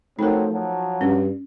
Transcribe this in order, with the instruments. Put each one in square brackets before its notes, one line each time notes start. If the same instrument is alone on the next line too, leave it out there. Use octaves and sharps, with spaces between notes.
[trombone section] F3 F#3 C4 [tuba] A3 [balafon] D#4 A#4
[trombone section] F3 F#3
[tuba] G2 [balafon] C#4